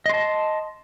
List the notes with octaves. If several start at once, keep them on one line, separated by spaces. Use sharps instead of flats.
D#5 A5 C6